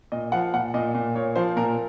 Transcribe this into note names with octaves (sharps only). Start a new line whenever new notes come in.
A#2 D#5
F3 F#5
A#2 F#5
A#2 D#5
A#2
A#2 C#5
F3 C5
A#2 A#4